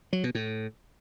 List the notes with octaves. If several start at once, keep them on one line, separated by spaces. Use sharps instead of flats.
F#3
B2
A2